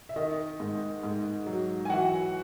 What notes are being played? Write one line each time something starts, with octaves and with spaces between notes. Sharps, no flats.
E5
D#3 D#5
G#2
G#2
F#3
G#5
E3 F#4 F#5